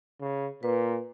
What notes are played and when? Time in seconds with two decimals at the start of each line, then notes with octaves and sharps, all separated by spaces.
0.21 C#3
0.63 A#2 B4